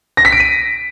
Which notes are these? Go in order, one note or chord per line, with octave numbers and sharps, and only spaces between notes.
A#6
B6
D7
D#7